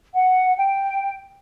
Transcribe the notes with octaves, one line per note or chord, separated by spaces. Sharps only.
F#5
G5